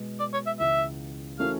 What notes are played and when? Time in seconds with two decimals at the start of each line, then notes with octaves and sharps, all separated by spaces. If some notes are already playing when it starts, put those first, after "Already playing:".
Already playing: B2 G#3 B3
0.20 D5
0.33 C#5
0.46 E5
0.59 C#2 C#3 E3 E5
1.39 E3 A3 C#4 F#4 A#4 F5